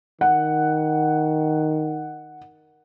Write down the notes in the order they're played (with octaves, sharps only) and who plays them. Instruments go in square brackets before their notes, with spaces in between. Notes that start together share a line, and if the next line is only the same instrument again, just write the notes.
[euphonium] D#3 [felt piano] F#5